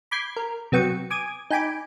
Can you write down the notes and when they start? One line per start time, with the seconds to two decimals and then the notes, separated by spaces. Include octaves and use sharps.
0.11 B5 D6 G6 G#6 C7
0.36 A#4
0.72 C3 F#3 B3 G5 C#6
1.10 G#5 D6 D#6 G#6
1.50 D#4 G5 G#5 B5 D6